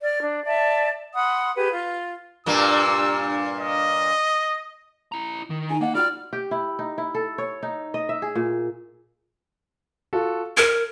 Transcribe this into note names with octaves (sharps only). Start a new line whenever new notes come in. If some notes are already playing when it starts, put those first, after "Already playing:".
D5 F6
D4
D5 E5 A5
F#5 B5 C6 D#6
G4 G#4 B4
F4
G2 A#2 A#3 E6
D#5
E4 A#5
D#3
D#4 E4 G#5 A#5
A#3 D#5 F#5 G5
F4 F#4 D5 G5 F6
G4
E4
D#4
E4
A4
C#5
D#4
D#5
E5
G#4
A#2
F4 F#4 A4
A#4 G#6